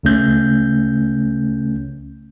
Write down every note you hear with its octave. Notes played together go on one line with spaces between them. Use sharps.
C#2 C#3 A3 C#4 G6